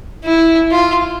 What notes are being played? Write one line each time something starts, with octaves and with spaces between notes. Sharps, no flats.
E4
F4